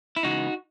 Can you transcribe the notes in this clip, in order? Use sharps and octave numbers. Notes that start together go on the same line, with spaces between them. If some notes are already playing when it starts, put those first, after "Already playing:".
E4
C#3 E3 G#3 B3 D#4 F#4